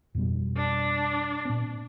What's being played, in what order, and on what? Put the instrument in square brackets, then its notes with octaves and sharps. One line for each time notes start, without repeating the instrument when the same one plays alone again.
[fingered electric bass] F2 B2 G3
[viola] D4
[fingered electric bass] A#2 C4